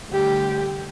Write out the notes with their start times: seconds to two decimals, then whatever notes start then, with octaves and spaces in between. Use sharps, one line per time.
0.10 D2 D3 G3 G4